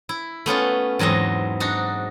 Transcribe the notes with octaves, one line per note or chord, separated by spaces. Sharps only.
E4
A3 B3 C#4 F4
E2 G#2 F#3 C4 D#5
D4 D#4 F#4